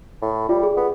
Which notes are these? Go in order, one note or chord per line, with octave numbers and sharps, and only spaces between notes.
A2
G3 F4
G#4
B3